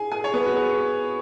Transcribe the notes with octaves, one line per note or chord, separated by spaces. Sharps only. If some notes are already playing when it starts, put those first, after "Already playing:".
Already playing: G#4 G#5
G#4 G#5
C#5
B3 B4
F#4
G#4